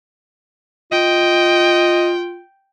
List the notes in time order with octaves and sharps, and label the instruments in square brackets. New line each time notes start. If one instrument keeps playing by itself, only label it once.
[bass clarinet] F4 [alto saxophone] D#5 [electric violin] G5